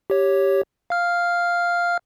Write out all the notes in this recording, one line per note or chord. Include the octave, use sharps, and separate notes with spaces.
G4 C#5
F5 F6